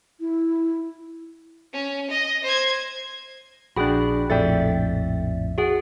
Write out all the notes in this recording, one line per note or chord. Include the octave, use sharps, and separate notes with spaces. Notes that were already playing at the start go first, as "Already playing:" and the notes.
E4
C#4
D#5
C5 G#6
A#1 D4 F#4 G#4 G5 B5 F#6
A#1 F2 A2 A4 D5 E5 G5 A6
F#4 G#4 F#5